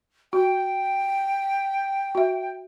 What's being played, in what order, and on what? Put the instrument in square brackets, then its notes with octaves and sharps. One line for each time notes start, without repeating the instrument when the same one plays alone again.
[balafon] F#4 [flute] G5
[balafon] F#4 E5